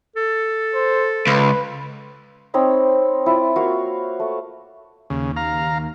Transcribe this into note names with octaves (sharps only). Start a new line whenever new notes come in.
A4
C5
C#2 B4
C4 D#4 C#5 B5
E4 F4 D5
A#3 F#4 F5 C#6
A3
D#2 C#3
F5 A#5